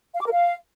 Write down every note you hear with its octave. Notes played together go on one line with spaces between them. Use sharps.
F5
D6
A#4
F5